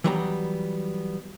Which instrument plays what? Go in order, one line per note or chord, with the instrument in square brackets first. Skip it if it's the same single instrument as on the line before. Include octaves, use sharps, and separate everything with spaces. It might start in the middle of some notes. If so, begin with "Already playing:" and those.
[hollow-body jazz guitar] E3 F#3 G3 B3 G#5 A#5